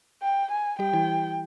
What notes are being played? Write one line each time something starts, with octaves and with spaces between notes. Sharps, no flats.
G5
G#5
G3 G4 G5
E3 E4